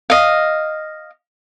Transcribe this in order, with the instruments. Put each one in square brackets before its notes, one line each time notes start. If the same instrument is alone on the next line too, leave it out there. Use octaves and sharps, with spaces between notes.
[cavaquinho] D#5 F5